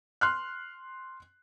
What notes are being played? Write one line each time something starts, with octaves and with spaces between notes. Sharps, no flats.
C6 F6 F#6